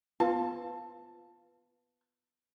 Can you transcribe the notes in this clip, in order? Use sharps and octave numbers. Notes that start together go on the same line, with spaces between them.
B3 F4 B4 A5